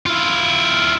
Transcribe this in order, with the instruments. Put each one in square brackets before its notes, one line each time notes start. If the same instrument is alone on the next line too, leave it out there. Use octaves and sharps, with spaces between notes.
[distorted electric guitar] E4 F4